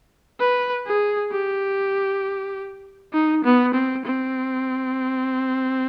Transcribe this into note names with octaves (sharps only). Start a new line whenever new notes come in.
B4
G#4
G4
D#4
B3
C4
C4